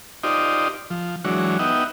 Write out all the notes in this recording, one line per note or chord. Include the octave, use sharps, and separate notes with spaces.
D#4 F4 G4 C5 D5 D#5
F3
E3 F#3 G#3 D4 F#4 C#5
B3 D#4 D#5 E5 F#5 G5